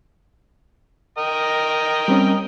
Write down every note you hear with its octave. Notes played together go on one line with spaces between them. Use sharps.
A#4 D#5 G5
G3 C4 C#4